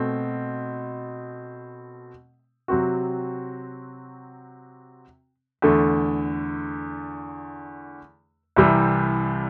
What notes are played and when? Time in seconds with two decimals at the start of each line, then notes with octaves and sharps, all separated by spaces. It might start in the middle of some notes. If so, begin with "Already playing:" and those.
Already playing: B2 A3 C4
2.68 C3 F#3 C4 F#4
5.62 E2 D3 A3
8.56 C2 C3 E3 G3